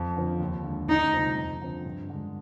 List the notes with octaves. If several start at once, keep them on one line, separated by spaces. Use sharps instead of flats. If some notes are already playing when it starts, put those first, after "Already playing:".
Already playing: F2
D3 F3 C4
D#2
D3 G#3
D2 D#4
C3 G3 C4 F4
F2
D3 F3 C4
G2
D3 G#3